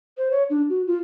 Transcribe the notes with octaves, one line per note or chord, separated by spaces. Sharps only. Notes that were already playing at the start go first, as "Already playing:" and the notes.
C5
C#5
D4
F#4
F4